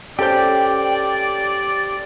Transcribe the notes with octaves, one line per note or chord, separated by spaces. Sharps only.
C#4 G4 A4 C5 D5 G5 G6